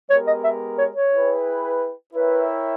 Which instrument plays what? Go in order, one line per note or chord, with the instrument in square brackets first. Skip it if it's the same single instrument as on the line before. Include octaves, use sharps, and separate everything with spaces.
[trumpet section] G#3 B3 G4 A#4 [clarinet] C#5
[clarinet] D#5
E5
C#5
C#5
[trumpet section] E4 G#4 B4 G5
[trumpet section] E4 A#4 C#5 E5 G5 [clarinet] B4